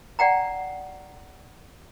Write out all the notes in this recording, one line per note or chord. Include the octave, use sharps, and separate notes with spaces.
D5 F#5 G5 A#5